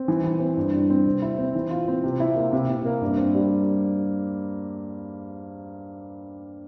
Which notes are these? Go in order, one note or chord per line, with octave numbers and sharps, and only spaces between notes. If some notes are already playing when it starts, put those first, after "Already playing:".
Already playing: C4
E3
E3
C4
G2
G2
C4
C3
E4
C4
E3
F4
C4
C3
E4
A#3
C3
C3
A#3
G2
C4
G3